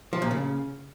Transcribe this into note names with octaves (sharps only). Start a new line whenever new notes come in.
F3
A#2
C#3